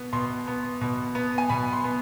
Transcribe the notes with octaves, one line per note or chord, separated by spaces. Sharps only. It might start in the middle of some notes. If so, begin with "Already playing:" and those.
Already playing: B2 B3
B2 C6
B3
B2
B3
G#5
B2 B5
C6
B3